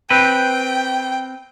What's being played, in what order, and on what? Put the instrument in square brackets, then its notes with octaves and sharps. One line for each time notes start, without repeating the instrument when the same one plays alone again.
[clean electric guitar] C4 B4 [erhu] G5